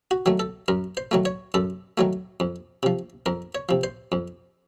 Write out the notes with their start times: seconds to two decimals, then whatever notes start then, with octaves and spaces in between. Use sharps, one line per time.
0.11 F#4
0.26 D#3 F#3 A3
0.40 A4
0.68 F#2 A#4
0.97 C5
1.11 D#3 F#3 A3
1.25 C#5
1.54 F#2 A4
1.98 D#3 F#3 A3
2.40 F2
2.83 C3 F3
3.26 F2 A#4
3.55 C#5
3.69 C3 F3
3.84 C5
4.12 F2